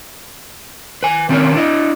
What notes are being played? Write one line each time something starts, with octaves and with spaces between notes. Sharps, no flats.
B4 G#5
D#3 C4 C#4 G#4 A#4 B4
D4 E4 D#5